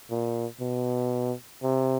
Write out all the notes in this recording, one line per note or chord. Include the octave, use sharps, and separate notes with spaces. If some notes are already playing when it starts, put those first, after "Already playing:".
A#2
B2
C3